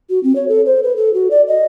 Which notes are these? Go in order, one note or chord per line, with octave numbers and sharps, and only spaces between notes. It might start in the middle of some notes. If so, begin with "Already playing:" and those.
F#4
C4
C#5
A4
C5
B4
A4
F#4
D5
D#5